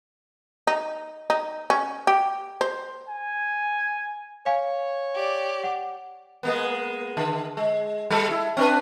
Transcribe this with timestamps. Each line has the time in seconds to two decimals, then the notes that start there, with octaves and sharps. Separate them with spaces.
0.67 D#4
1.30 D#4
1.70 C#4
2.07 G4
2.61 C5
3.09 G#5
4.46 C#5 F5 G#5
5.14 G4 D5
5.64 F#5
6.43 G#3 A#3 B3
7.17 D3
7.57 G#3
8.10 G3 G4 A4
8.31 E4
8.57 C4 D4 B4